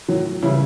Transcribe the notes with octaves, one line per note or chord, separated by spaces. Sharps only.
A2 F#3
C#3 E3 G3 E4